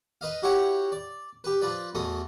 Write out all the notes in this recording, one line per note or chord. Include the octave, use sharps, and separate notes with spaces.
B4 D#5 F5
E4 F#4 G4 C#5 F#5 G5
D5
G4 B4
F3 B4 D5
E2 B2 A3 D#6